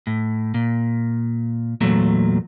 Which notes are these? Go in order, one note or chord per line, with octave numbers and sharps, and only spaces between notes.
A2
A#2
E2 A#2 F#3 A3